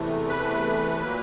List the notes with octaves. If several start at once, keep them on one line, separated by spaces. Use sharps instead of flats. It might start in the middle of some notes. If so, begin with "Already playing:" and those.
Already playing: E2 C3 E3 A3
B4
A#2 F#3 A#3